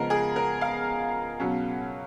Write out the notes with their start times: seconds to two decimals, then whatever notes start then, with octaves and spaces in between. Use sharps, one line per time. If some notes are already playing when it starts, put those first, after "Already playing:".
Already playing: C#3 F3 G#3 B3 A#4
0.10 G#4
0.36 A#4
0.61 F5
1.40 B2 F#3 C#4